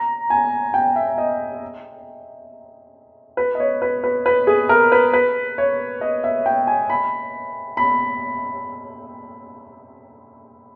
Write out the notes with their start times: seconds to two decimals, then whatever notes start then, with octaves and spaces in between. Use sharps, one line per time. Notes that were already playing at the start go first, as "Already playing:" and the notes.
Already playing: A#5
0.30 G#5
0.74 G5
0.96 E5
1.18 D#5
3.37 B4
3.55 D#5
3.60 C#5
3.82 B4
4.04 B4
4.26 B4
4.47 G#4
4.69 A#4
4.92 B4
5.13 B4
5.58 C#5
6.01 D#5
6.24 E5
6.46 G5
6.67 G#5
6.90 B5
7.77 B5